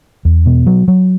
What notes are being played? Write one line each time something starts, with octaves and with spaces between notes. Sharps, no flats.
E2
B2
F#3
F#3